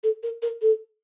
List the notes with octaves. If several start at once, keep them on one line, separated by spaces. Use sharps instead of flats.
A4
A#4
A#4
A4